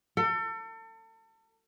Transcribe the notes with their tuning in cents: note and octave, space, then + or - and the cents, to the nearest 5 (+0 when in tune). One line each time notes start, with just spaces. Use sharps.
A4 +35